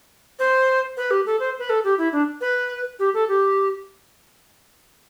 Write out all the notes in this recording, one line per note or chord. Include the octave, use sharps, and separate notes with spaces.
C5
B4
G4
A4
C5
B4
A4
G4
E4
D4
B4
G4
A4
G4